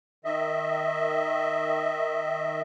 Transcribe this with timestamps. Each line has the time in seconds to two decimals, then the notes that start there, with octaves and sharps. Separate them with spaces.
0.25 D#3 D#5 E5